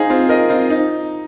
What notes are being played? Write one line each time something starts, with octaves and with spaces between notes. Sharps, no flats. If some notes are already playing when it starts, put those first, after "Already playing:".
Already playing: D#4 G#4 C5 F5
C4 F4
A#4 D#5
C4 F4
D#4